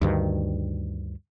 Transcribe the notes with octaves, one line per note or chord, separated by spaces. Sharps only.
D2 G2 D#3